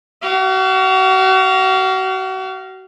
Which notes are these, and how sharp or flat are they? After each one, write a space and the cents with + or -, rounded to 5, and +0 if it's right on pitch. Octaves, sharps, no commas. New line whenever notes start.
F#4 +35 F5 -15